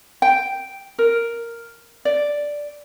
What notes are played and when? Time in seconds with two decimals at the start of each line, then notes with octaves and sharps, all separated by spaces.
0.22 G5
0.99 A#4
2.05 D5